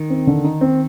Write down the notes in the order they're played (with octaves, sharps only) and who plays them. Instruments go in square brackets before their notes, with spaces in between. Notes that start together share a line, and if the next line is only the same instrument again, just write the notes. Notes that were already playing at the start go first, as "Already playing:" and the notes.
Already playing: [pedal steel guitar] D#3
[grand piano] C4
D3
D#4
C4